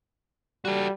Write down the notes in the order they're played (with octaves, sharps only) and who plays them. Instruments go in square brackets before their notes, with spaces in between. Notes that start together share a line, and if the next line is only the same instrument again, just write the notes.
[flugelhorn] G3 [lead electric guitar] F#4 A4